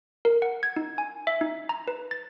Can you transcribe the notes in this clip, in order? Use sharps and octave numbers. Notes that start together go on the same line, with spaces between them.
A#4
F#5
G#6
D#4
G#5
E5
D#4
A#5
B4
A6